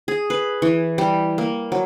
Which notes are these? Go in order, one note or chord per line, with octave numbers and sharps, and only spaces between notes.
G#4
B4
E3
G3
A#3
F#3